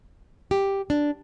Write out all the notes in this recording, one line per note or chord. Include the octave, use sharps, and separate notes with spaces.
G4
D4